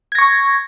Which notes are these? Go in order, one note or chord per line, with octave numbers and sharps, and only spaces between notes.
C#6 G#6 A#6